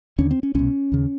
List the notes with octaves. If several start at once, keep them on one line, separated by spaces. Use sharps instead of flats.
D#2 D3 C#4
C4
C#4
C2 B2 C#4
D#2 C#3